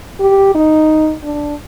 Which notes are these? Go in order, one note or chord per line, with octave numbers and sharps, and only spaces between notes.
G4
D#4
D4